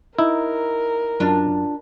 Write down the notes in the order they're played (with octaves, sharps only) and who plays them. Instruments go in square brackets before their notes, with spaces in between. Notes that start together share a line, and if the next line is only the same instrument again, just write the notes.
[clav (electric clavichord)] D#4 E4 [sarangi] A#4
[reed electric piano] F#2 [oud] D4 F4